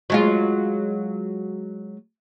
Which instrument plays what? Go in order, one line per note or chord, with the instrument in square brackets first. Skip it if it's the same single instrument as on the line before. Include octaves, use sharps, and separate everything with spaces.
[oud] F#3 G#3 F4